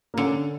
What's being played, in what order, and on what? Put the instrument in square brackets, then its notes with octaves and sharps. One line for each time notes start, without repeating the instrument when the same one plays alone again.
[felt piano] A#3
[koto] D3 [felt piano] C#4